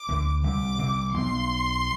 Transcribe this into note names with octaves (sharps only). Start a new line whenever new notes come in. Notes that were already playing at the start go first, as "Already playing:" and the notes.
Already playing: D6
D2 D3
C2 C3 D6
C2 C3
B1 B2 C6